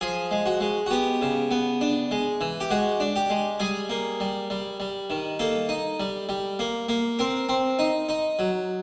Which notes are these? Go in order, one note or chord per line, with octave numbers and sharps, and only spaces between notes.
F3 G#4
G#3
F#4
G#3
F#4
B3 G4
C#3
B3
D4
G#3
E3
G4
G#3 F#4
D4
G4
G#3
G3 G#4
A#3
G3
G3
G3
D#3
A#3 A4
D#4
G3
G3
A#3
A#3
C4 A#4
C4
D#4
D#4
F#3